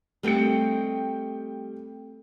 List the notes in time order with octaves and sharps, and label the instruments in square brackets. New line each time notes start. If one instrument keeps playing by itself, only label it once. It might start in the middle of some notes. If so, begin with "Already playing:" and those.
[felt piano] G3 G5 C#7 [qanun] A3 C4 D#5